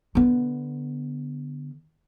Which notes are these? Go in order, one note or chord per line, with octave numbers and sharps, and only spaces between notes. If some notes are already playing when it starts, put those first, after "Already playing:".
D3 B3